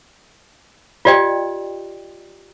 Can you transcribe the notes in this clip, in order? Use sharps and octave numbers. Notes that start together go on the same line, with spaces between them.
F4 G4 D5 D#5 G5